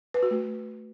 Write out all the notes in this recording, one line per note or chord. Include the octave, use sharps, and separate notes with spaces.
B4
F#4
A3